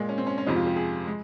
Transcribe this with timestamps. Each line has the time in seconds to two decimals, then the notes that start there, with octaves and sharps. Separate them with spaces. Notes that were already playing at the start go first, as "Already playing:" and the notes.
Already playing: A#2 G#3
0.09 C#4
0.18 C4
0.27 C#4
0.38 C#4
0.46 F2 C3 F3 G#3 D#4
0.56 F4
0.66 G4
0.76 G#4
1.07 G#3